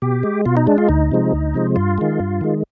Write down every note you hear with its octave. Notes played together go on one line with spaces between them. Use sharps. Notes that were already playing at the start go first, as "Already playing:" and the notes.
B2 G4
G#3
B2 F4
D#4
G#3 D4
F4
D2 D#4
C3 F3 G#3
D2
C3 F3 G#3
G2 F4
D#3 G#3
G2
D#3 G#3